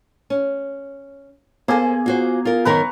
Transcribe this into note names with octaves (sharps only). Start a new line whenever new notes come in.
C#4
A#3 B3 G#4 A4 C5 G#5
F4 F#4 C5
F4 A#4
F#2 D#3 A#4 B4 A#5 C#6